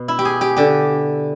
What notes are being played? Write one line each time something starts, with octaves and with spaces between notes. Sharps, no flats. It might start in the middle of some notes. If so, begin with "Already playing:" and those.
Already playing: B2
E4
G4
G#4
G4
D3 G4